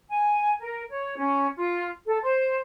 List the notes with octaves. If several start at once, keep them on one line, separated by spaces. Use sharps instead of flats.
G#5
A#4
C#5
C#4
F4
A4
C5